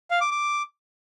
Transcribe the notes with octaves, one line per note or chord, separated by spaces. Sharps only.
F5
D6
D6